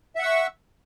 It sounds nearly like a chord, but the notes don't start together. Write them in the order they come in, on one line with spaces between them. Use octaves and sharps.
E5 F#5 E6 C#6